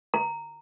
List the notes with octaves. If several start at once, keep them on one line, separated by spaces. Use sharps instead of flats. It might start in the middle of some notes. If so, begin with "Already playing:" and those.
A#5